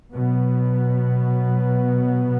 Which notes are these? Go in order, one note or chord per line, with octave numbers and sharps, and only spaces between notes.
B2 F#3 B3